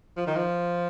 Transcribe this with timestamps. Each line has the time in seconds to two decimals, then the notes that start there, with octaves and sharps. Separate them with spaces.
0.17 F3
0.27 D#3
0.36 F3